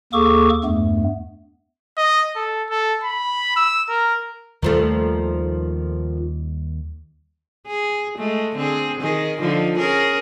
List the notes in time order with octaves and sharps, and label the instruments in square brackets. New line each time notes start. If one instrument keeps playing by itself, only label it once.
[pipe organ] D#2 A#3 G#4 A4 C#6 D6
E2 G2 A3 B3
[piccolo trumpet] D#5
A4
A4
B5
E6
A#4
[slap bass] D#2 G3 [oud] D#3 F3 A3
[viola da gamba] G#4
G#3 A3
D3 C4 G#4
D#3 G#4
D3 F3 D#4
C#4 G#4 A#4